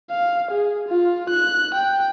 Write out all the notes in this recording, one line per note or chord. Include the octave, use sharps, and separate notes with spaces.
F5
G#4
F4
F#6
G5